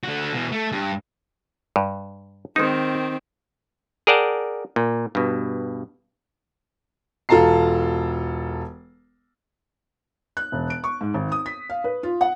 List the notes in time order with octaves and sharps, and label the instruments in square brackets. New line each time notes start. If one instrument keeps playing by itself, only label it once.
[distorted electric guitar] D3 F#4
B2 E3
A3
G2
[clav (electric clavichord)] G2
[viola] D#3 C4 [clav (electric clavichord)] G#3 D#4
[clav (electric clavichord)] G#4 A#4 D5 F#5 G5 A5
A#2
G2 B2
[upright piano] E1 F4 A4 A5 A#5 C7
[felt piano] F#6
E1
D7
C#6
G#2
G#1
D#6
B6
F5
B4
F4
F#5